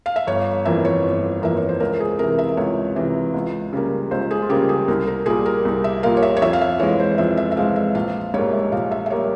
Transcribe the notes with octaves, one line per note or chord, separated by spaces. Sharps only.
F5
E5
G1 C#5
F2 E3 A#3 E5
C#5
G1
F2 E3 A#3 E5
C#5
C5
C#2 A#4
G#4
C3 E3 A#4
E5
E5
C#2 C#5
C3 E3
C#2
C#3 G3 A#3
C#2 C5
G#4
F4
C#3 G3 A#3 G4
G#4
C2 A#4
A#4
A#2 G3 A#3 G#4
A#4
C2
E5
A#2 G3 A#3 F5
C#5
E5
C#5
F2 E5
F5
E5
E3 G#3 C#5
C5
F2 E5
E5
E5
E3 G#3 F5
E5
A#1 F5
G#2 G3 A#3 C#5
E5
A#1 F5
E5
E5
G3 A#3 C#5